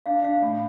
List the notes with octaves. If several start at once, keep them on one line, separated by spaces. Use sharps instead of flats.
D4 F5
D4 F5
A2